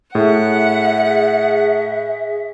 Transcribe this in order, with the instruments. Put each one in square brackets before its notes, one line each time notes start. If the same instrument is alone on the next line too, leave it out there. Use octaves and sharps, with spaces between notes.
[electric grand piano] A2 [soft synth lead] G#4 [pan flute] E5 [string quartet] F#5